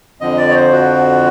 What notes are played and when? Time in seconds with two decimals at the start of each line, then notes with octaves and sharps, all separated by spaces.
0.20 F2 D3 F3 D#5
0.38 D5
0.50 C#5
0.55 C5
0.72 F#4